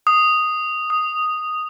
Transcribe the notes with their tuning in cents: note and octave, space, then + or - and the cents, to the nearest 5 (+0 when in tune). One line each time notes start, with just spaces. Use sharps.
D#6 -5
D#6 +0